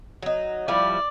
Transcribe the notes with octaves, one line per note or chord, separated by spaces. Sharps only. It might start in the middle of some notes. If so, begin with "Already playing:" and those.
F#3 D#4
F3 G3 E4 D5